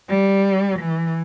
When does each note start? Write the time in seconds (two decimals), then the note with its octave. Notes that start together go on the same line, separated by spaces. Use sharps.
0.09 G3
0.79 E3